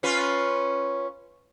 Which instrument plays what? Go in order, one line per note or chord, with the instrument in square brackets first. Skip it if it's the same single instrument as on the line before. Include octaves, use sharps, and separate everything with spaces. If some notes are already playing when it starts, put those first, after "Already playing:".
[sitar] C#4 F4 B4